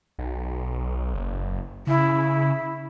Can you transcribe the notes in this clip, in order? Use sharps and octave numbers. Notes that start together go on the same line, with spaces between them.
B1
F#1
C#3 E4